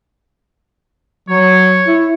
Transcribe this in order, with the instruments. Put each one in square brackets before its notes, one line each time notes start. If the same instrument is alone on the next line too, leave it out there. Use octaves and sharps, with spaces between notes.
[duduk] F#3 [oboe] C#5
[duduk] E4